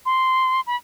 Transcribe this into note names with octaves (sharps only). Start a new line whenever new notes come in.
C6
B5